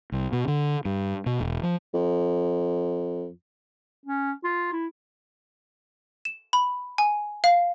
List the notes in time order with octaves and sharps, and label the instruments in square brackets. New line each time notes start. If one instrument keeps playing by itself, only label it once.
[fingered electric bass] C2
B2
D3
G2
B2
E1
F3
[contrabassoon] F2
[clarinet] C#4
F4
E4
[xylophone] E7
B5
G#5
F5